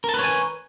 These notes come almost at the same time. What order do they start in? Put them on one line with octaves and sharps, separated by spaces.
A#4 A5 B4 C#5 G#5